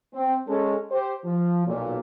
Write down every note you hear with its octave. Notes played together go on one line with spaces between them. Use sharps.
C4
G#3 C#4 A4
G4 C5
F3
B1 A#2